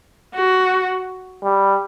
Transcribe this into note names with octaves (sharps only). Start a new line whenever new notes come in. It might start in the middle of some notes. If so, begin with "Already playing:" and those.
F#4
G3